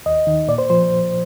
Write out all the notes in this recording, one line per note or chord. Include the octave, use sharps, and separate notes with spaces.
D#2 D#5
D#3
A#2 D5
C5
F3 C5